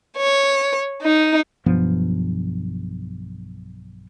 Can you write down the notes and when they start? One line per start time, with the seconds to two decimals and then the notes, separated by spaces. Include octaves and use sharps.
0.17 C#5
1.02 D#4
1.66 B1 G2 F3 B3